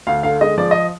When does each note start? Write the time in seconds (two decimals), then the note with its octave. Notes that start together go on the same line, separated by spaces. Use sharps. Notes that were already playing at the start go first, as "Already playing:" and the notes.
0.07 D2 F5
0.23 D3 F5
0.41 G#3 D#5
0.58 F3 D5
0.71 D#5